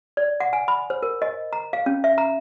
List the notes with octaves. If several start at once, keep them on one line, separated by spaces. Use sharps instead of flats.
D5
F#5
G#5
B5
C5
A#4
D#5
A#5
F5
C#4
E5
A#5